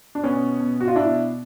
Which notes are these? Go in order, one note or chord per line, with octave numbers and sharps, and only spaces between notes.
D4
B2 B3 C#4
B2
F#4
F4
B2 D4 E4